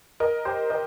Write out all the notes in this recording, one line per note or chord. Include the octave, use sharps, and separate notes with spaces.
A#4 D#5
G4 C5
A#4 D#5